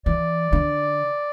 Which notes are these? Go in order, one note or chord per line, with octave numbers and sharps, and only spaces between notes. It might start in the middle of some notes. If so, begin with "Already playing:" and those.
E3 D5
D3